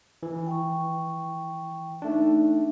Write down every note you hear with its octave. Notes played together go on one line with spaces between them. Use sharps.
E3
G5 C#6
A3 D4 D#4 E5